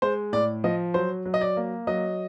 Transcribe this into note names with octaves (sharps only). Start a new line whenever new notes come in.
G#3 C5
A2 D5
F3 D#5
F#3 C5
F#3
D#5
D5
A#3
F#3 D#5